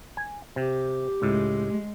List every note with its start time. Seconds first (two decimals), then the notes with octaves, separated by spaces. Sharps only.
0.17 G#5
0.56 C3 G4
1.22 C#2 A2 G#3